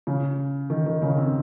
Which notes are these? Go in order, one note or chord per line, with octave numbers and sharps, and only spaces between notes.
C#3
D#3
D#3
C#3
C4